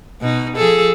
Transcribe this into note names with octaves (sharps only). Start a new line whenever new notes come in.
B2 D#4
F3 G#4 A4